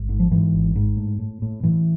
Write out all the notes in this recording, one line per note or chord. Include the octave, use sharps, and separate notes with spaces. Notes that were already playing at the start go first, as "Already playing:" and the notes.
Already playing: G#1
G#2
F3
G#2 E3
G#1
G#2
A2
A2
A2
A2 E3